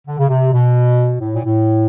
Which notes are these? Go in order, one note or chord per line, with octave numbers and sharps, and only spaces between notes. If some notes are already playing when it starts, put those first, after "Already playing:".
D3
C#3
C3
B2
A2
A#2
A2